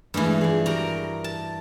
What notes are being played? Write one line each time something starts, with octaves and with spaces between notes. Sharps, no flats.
G2 E3 G#3 A3
F3 G#4
F#4 G4 A#4 A#5
A5